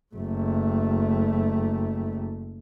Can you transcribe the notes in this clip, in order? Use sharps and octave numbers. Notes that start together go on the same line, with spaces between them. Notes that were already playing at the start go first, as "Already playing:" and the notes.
F#1 A3